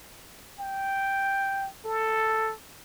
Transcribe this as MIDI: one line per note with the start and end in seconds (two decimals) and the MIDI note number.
0.59 1.68 79
1.85 2.53 69